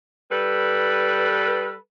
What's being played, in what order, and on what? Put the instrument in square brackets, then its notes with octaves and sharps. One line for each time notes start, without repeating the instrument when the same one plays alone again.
[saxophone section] G3 A4 B4